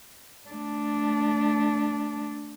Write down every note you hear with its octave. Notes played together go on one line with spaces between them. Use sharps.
A3 D4